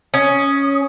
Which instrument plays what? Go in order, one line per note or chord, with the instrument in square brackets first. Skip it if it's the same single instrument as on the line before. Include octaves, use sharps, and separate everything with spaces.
[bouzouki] C#4 [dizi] D#6